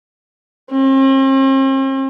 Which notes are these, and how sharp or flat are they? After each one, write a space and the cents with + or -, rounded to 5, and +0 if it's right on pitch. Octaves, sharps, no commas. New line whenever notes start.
C4 +45